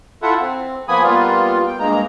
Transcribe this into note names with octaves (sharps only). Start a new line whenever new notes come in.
E4 F4 A4 E5 F#5
C4
F3 A#3 B3 G#5 B5 D#6
G3 A#3 B3 F4
G5
G2 G#3 A#3 A#5